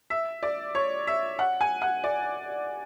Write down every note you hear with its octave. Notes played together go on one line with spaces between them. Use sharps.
E5
D5
C#5
E5
F#5
G#5
F#5
D5